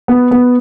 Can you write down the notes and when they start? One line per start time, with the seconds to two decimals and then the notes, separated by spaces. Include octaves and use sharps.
0.08 B3
0.31 B3